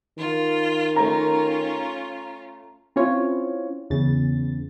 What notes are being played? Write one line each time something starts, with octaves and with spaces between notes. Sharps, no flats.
D#3 F4
A3 C#4 F4 A#5
C4 C#4 E4 F4 C#5
E2 C#3 A6